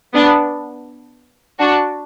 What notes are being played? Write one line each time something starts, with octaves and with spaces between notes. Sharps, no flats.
B3 D4
D4 F#4